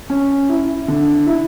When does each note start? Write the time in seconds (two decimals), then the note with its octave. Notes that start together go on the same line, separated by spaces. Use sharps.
0.10 C#4
0.49 E4
0.88 D3
1.26 E4